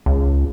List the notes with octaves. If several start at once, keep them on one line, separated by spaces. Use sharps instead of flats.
C#2